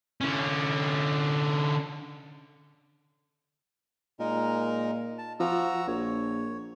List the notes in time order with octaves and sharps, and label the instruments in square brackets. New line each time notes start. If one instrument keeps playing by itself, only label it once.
[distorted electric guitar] D3 C#4
[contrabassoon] A#2 [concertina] G#3 D#4 A#4
[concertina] A5
[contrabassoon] F3 [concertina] F#4 A#5 E6
[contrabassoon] A#1 [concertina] C#5